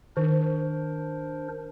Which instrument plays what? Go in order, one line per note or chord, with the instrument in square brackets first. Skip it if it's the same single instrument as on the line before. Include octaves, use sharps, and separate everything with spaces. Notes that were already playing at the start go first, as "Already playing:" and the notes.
[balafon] D#3 [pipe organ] D4 A#4 C5